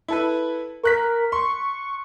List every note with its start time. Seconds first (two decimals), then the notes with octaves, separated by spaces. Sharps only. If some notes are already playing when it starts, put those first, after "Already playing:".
0.08 E4 A4 B4
0.84 A#4 C#6 F#6 B6
1.32 C6 C#6